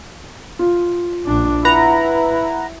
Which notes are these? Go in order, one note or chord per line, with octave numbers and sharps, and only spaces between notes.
F4
A#1 D4
E4 B4 F#5 A#5